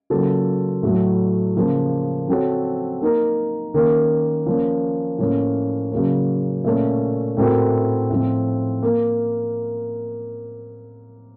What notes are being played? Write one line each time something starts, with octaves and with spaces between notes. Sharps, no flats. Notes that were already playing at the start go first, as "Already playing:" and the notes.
C#3 F#3 A#3 F4 A4
A2 F#3 A3
C#3 F3 A#3
F3 C4 F#4 A4 C#5
A#3 D#4 A#4
D#3 A#3 C#4
F3 A#3 C#4
A2 F3 A#3 C#4
C#3 F#3 A#3 C#4
A#2 A3 C#4 A4
A2 A3 C4 F#4 A#4
A2 F3 C4
A#3